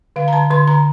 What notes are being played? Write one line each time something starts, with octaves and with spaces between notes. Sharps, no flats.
D3 F5
A#5
D3 A5
D3 C6
D3 A#5